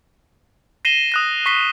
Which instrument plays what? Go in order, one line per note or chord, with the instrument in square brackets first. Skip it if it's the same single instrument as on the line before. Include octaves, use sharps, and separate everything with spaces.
[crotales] A#6 C7 D#7 E7 G7
D#6 F#6 A#6
C#6 B6 C7 G7